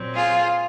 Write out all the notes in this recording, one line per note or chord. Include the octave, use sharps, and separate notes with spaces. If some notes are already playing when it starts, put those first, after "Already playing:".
Already playing: A#2 F#3 C4
F4 G#4